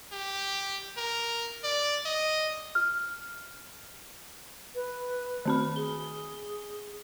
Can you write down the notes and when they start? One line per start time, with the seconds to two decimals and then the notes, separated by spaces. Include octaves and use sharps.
0.12 G4
0.97 A#4
1.64 D5
2.06 D#5
2.75 F6
4.75 B4
5.45 D#3 C4 B5
5.76 G#4 G7